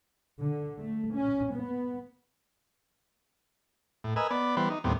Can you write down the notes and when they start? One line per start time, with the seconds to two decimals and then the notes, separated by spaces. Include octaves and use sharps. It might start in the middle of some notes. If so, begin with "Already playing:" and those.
0.41 D3
0.79 A3
1.14 C#4
1.53 B3
4.04 A2
4.16 A#4 B4 D#5 G#5 E6
4.31 B3 D5 B5
4.57 E3 G3 B3 B4 C5
4.70 D#4
4.84 D#2 A2 G3 B3 C4